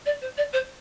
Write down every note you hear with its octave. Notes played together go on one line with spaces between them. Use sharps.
D5
C5
D5
C5